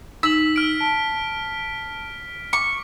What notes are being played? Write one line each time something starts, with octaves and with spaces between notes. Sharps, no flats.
D#4 E6 B6 F#7
F6 D7
A5
C#6 D6